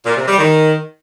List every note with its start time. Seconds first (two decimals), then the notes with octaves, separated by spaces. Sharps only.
0.06 A#2
0.17 C3
0.28 G3
0.39 D#3